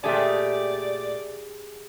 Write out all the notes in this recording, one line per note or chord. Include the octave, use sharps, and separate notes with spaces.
A#2 A3 G4 G#4 D5 G#5 A5